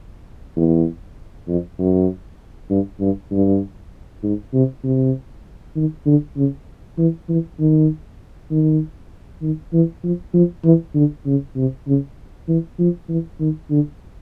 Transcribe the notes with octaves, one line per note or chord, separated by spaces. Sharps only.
E2
F2
F#2
G2
G2
G2
G#2
C3
C3
D#3
D3
C#3
E3
E3
D#3
D#3
D#3
E3
F3
F3
E3
D3
C#3
C3
C#3
E3
F3
E3
D#3
D3